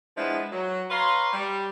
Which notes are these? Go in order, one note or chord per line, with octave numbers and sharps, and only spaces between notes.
F3 G#3 B3 D4 E4 B4
F#3
B4 C#5 F5 A#5 C6
G3